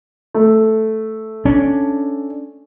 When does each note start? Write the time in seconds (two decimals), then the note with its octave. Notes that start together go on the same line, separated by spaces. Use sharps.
0.34 A3
1.45 C#4 D4